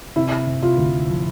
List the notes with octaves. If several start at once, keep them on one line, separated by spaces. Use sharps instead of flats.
C3 E4
C3
F4
D2
F3